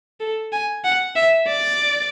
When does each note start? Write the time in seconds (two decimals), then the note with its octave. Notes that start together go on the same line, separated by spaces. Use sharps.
0.20 A4
0.52 G#5
0.84 F#5
1.16 E5
1.48 D5